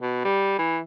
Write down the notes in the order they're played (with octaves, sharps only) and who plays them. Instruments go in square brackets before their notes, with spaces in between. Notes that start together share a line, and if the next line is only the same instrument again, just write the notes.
[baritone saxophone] B2
G3
E3